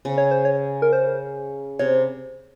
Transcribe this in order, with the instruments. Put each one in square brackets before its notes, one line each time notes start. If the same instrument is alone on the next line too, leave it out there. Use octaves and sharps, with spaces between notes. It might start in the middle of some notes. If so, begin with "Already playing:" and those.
[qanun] C#3
[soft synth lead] C#5
C5
C#5
A#4
C5
[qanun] C3 [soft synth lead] C#5